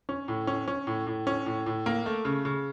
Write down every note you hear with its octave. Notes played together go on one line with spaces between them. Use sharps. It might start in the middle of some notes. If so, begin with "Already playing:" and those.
C#4
A2
C#4
C#4
A2
A2
C#4
A2
A2
A#3
A3
C#3
C#3